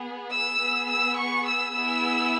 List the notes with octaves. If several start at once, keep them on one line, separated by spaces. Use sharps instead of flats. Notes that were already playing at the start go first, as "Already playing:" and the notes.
Already playing: B3 G#4
E6
B3 G#4
E6
C#6
E6
B3 E4 G#4 E6